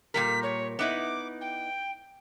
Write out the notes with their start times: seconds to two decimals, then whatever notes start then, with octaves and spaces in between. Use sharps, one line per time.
0.14 A#2 G3 A#4 B6
0.43 C#5
0.79 B3 D#4 E4 D6
1.41 G5